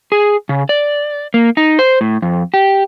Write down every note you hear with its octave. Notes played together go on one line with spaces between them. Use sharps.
G#4
C#3
D5
A#3
D#4
C5
A2
F2
G4